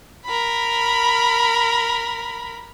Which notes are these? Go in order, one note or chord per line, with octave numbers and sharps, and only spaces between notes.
A#4 B5